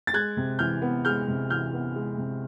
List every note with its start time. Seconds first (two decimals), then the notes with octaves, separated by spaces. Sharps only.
0.07 A6
0.13 G#3 F#6 G#6
0.37 C3
0.59 E3 F6 G6
0.82 B3
1.05 G#3 F6 G6
1.28 C3
1.50 E3 F6 G6
1.73 B3
1.96 G#3
2.18 C3